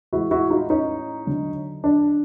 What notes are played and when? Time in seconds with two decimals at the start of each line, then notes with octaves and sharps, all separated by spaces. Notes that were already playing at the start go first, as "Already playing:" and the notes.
0.12 A2 E3 G#3 E4 F#4
0.31 E4 F#4
0.50 D#4 F4
0.70 C#4 D#4
1.26 D3 F#3
1.84 D4